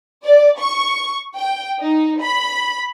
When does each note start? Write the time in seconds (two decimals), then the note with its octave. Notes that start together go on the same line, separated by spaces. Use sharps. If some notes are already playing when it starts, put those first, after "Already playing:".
0.23 D5
0.58 C#6
1.35 G5
1.79 D#4
2.20 B5